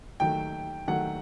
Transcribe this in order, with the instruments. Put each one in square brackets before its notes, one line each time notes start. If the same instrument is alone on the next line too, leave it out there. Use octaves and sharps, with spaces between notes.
[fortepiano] D#2 D#3 F#3 A3 [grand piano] G5
[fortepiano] D#2 D#3 F#3 A3 [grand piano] F#5